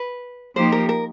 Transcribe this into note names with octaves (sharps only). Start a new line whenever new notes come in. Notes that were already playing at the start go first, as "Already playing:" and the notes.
Already playing: B4
F3 A#3 D#4 G4 C5
A#4
A#4